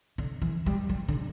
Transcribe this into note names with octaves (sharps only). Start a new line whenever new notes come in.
D3
E3
G3
G3
D3